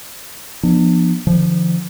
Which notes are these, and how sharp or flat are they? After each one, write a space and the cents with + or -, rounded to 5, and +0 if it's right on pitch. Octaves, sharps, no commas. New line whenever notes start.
F3 -5 B3 -25 D4 +40
D3 +35 F3 -20